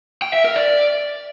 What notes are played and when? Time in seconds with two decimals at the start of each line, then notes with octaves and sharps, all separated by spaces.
0.22 G5
0.33 E5
0.44 A#4
0.56 D5